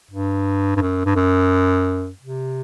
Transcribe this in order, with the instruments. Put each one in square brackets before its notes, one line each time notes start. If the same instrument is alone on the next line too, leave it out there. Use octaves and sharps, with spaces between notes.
[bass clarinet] G2
G2
F#2
G2
F#2
C3